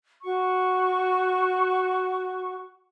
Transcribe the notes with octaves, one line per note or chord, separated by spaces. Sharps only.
F#4 C#6